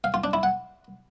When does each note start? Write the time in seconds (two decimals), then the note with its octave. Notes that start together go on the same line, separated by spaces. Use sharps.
0.04 F5
0.14 F4
0.24 D4
0.33 E4
0.43 F#5